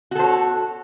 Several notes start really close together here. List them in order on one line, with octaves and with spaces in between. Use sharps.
F#4 A4 C5 C#5